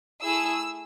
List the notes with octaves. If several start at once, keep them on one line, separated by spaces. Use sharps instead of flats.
A3 E4 G#4 E6